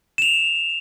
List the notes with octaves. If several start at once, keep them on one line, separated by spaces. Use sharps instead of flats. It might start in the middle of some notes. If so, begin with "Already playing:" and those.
E7 F7